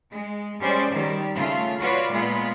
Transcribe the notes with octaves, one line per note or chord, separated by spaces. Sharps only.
G#3
G3 G#3 C#4 C5 D5
D#3 G3
C#3 A3 F4
F4 F#4 B4 C#5 D5
A#2 G#3 B3 F4